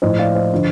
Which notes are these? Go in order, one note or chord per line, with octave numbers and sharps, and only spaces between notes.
A2 F3 C5 D#5
D5 F5
C5 D#5
D3 F3